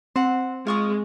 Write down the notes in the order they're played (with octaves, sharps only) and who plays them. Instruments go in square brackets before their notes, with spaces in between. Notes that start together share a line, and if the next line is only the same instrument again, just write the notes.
[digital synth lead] C4 [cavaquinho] C5 F#5
[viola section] G#3 [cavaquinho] F4 C#6 D#6